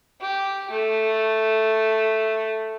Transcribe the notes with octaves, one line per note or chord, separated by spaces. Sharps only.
G4
A3